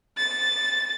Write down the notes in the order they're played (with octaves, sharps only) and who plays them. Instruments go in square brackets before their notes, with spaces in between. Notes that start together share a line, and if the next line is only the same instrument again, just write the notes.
[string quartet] A6